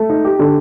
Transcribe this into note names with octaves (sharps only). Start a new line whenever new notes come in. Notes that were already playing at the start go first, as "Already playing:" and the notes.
Already playing: A3
D#4
G4
D3